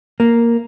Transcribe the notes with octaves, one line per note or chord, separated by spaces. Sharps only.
A#3